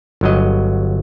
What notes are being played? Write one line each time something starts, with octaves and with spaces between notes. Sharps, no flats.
G1 F#3 D#5